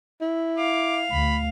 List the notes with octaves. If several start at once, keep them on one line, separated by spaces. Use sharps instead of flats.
E4
F5 D6
D2 B5